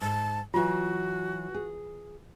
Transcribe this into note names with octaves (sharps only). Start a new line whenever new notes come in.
G#2 A5
E3 F#3 F4 F#4
G#4